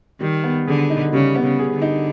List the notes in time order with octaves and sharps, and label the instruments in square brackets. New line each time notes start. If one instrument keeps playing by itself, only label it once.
[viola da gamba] D#3 [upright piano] G3
[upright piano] B3
[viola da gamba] D3 [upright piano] G#4
[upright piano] D#4
[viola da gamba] C#3 [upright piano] G3
[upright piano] B3
[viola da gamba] C#3
[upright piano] G#4
[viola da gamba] D3
[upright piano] D#4